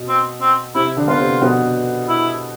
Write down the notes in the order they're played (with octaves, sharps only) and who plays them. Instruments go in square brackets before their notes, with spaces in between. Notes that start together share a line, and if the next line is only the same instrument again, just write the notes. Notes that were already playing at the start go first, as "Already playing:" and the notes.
Already playing: [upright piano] B2
[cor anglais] C4
C4
[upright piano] C3 C4 [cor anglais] E4
[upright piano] D3 D4
[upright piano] B3 [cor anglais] F4
[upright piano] C3 C4
B2 B3
[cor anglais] E4